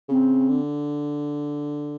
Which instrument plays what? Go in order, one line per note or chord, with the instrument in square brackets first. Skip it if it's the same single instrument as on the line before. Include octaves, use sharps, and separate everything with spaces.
[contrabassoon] C#3 [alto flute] C4
[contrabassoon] D3